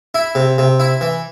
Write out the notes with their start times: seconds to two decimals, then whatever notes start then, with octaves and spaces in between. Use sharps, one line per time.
0.15 E4
0.35 C3
0.58 C3
0.80 E4
1.01 E3